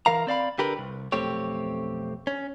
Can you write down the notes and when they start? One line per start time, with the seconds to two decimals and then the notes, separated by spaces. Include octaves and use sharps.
0.06 E3 A#4 F5 A#5
0.27 C4 D5 F5 B5
0.58 D3 G4 A#4 B4
0.78 C2
1.12 B1 F2 A3 C4 G4 C#5
2.27 C#4